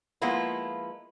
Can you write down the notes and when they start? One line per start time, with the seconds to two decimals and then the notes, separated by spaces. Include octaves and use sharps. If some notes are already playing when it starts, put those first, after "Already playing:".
0.22 F3 G#3 A#3 B3 E4 F4